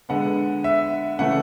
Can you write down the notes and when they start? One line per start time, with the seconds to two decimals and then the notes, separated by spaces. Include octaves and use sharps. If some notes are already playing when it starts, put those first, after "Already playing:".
0.09 D3 G#3 B3 F#5
0.64 E5
1.19 C#3 E3 A3 F#5